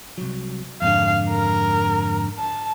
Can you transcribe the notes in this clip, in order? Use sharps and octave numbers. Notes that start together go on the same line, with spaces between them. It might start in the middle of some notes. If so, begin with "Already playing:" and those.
C2 F#3
F2 G#2 D3 F5
A#4
A5